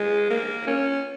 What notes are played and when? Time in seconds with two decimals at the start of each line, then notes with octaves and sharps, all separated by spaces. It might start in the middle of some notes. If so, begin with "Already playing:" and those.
Already playing: G#3
0.30 A#3
0.67 C#4